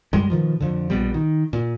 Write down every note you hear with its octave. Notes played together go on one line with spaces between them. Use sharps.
F#2 G3 G#3
B2 D#3 F3
F2 D3
A#1 B2 G3
D#3
A#2